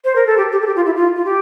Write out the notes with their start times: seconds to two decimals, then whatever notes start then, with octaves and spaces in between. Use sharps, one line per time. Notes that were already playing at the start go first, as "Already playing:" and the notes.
0.05 C5
0.16 A#4
0.27 A4
0.37 G4
0.52 G4
0.61 A4
0.67 G4
0.76 F4
0.86 E4
0.96 F4
1.16 F4
1.25 G4